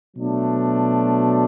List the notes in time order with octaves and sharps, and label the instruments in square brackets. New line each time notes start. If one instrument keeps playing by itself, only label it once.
[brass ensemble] B2 F#3 A3 D4